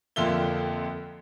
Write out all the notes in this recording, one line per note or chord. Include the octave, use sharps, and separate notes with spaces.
F2 D3 A#3 F4 E5 G7